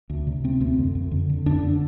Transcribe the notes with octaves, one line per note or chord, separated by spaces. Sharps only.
D2
C3
C3 C4
D2 C4
F2
F2
D3
D3
F2 D4
D3